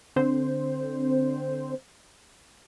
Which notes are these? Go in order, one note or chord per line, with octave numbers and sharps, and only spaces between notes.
D3 C4 C5